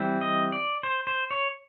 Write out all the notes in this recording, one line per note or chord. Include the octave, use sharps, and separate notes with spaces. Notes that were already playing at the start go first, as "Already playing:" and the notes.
Already playing: E3 G3 C4
D#5
D5
C5
C5
C#5